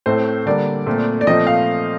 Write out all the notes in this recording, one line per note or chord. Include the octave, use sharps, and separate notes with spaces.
A2 A3 C4 C5
D3 G3 A#3 D5
A#2 A3 C4
D5
A#2 F3 A3 C4 D#5
F5